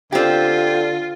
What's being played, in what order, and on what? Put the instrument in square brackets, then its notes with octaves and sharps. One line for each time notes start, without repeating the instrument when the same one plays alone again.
[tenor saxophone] D3 [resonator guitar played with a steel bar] C4 G4 [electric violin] F4